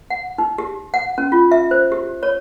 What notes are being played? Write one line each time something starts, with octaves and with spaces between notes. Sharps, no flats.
F#5
D#4
G4
F#5
C#4
F4
E5
C5
G4
C#5